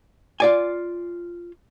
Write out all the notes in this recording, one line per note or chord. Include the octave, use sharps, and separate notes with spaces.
F4 D5 G#5